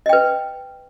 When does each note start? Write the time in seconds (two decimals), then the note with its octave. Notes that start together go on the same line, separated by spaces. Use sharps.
0.06 D#5
0.09 G5
0.13 B4